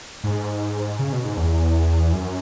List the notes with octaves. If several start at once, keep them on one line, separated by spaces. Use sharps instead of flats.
G#2
C#3
B2
G#2
E2
F#2